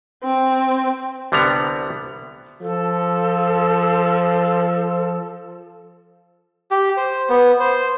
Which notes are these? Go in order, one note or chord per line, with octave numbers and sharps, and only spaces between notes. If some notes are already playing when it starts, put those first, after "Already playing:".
C4
C2 D3 G3 B3 A#5
F3 A4
G4
C5
B3
C5